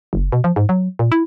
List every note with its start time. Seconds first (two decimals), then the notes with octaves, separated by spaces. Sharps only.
0.13 F#1
0.32 B2
0.44 F3
0.56 G#2
0.69 F#3
0.99 A#2
1.12 E4